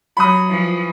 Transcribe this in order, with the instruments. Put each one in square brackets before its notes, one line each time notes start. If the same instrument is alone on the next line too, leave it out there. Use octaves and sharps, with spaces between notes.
[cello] F#3 [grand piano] B5 D#6
[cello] E3 F3